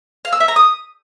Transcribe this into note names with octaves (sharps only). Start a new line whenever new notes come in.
F5
E6
E5
A#5
D#6